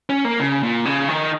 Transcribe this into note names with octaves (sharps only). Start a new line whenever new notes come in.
C#4
A#3
C#3
A#2
C#3
D#3